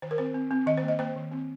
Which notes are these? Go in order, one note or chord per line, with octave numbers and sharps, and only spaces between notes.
D#3 C5
A#4
C4 C5
C4
C4
D#3 D#5
C5
A#3
D#5
A#3 C5
D#3
C4